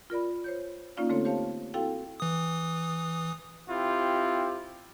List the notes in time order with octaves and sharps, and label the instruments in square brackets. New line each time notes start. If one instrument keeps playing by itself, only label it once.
[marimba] F4 A#4 D5 B5
C5 C#5 G6
A#3 C#4 D#4 F4 D5 F5
D3 A3 C4 A4 C#5
G4 C5 C#5 F5 A5
C4 E4 F#4 A4 F5 G5
[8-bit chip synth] E3 D#6
[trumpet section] C4 E4 F4 G4